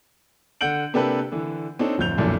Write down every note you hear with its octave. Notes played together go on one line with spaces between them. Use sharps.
D3 F#5 G6 D7 F#7
C3 A#3 D4 G4 A4 B4
D3 E3
C4 D4 D#4 A4 C#5
D1 F2 C4 G6 F7
B1 F2 A#2 D3 E3